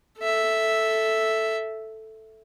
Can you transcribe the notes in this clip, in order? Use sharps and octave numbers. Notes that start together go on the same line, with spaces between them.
A4 E5